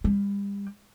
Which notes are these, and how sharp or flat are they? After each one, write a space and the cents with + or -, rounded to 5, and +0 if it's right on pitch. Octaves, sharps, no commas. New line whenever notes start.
G3 +35